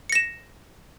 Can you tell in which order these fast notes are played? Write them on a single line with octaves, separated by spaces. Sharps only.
C#7 A#6 E7